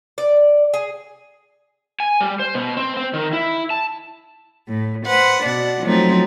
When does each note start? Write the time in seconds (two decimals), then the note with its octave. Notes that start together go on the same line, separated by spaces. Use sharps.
0.18 D5
0.74 G#4
2.00 G#5
2.21 G3
2.40 C5
2.55 B2
2.77 C4
2.97 C4
3.13 D#3
3.33 E4
3.70 A5
4.68 A2
5.06 B4 C5 F#5
5.43 B2 D4 F#5
5.83 F3 F#3 A3 C4 D#4